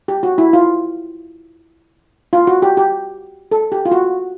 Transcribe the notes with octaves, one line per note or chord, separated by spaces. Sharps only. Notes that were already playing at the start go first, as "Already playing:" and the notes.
G4
F#4
E4
F4
F4
F#4
G4
G4
A4
G4
F4
F#4